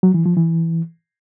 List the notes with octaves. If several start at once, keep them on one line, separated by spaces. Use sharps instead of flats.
F#3
E3
F3
E3